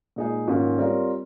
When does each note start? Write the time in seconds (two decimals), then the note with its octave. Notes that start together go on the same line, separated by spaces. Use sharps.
0.16 A#2 G#3 D#4 G#4
0.47 G#2 D#3 A#3 C#4 F4
0.78 G3 C4 F4 A#4 C#5